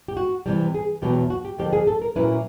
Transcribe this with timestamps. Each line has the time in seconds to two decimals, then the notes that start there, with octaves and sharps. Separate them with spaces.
0.08 G4
0.17 F#4
0.46 C3 E3 G3
0.74 G#4
1.02 E2 B2 F#3 B3 G4
1.30 F#4
1.45 G4
1.58 F2 D3 F3 A#3 G4
1.73 G#4
1.87 A4
2.02 A#4
2.15 A#2 F#3 A#3 C#4 E4 B4